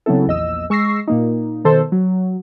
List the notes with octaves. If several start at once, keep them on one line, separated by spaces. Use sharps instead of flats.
C#3 F#3 B3 C4 E4 A4
A#1 E2 D#5 E6
G#3 C#6 E6 A#6 C7
A#2 A#3 D#4
B2 D#3 A4 C5
F#3